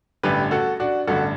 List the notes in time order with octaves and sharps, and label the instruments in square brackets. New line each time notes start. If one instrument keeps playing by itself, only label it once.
[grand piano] A1 G2 D3 G4 B4
F#4 A4
D4 F#4
A1 G2 D3 F#4 A4